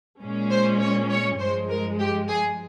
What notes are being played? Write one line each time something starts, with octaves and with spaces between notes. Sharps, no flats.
A#2 G#3 C#4
C5
C#5
C#5
G2 F3 G#3 C5
A#4
G4
G#4